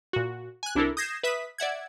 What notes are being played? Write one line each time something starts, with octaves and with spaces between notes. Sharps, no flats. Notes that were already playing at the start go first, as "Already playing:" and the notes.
A#2 F#4
G#5 F#6
C2 D4 E4 A4 A#4
D#6 G6 G#6 A#6 C7 E7
B4 E5 D#6 B6
D5 E5 F#5 G#6